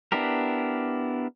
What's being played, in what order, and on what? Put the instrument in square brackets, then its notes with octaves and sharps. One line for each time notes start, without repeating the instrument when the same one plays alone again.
[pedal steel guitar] B3 D4 E4 G4 A#4